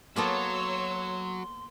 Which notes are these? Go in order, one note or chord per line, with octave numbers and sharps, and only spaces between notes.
F#3 A#3 B3 A4 C#5 C6 E6